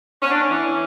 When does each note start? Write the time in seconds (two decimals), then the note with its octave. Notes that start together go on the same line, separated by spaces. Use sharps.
0.22 B3 C#4
0.31 D4
0.39 C#4
0.50 E3